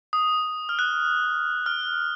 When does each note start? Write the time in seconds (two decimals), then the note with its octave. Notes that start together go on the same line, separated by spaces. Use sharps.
0.13 D#6
0.69 F6
0.79 F#6
1.66 F6